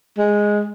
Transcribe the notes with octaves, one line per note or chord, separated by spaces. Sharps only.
G#3